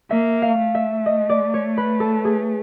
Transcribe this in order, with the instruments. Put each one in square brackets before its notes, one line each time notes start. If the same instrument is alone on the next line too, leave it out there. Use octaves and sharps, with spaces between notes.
[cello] A#3 [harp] E5
[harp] F5
[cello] A3
[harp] E5
D#5
D5
C#5
B4
A4
G#4